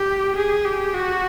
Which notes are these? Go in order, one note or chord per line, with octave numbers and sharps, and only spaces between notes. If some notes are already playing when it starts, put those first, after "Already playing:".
Already playing: G4
G#4
G4
F#4